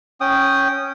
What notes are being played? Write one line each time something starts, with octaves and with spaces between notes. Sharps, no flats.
C#4 G5 D#6